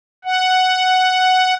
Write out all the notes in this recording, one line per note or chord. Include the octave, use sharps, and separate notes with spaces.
F#5